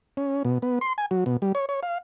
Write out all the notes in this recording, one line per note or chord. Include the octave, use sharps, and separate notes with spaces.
C#4
B2
B3
C6
G#5
F#3
B2
G3
C#5
C#5
F5